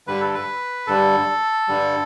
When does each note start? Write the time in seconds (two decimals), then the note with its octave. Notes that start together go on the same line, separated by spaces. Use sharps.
0.07 G2 D3 G3 B4
0.21 A4
0.34 B4
0.87 G2 D3 G3 A4
1.68 G2 D3 G3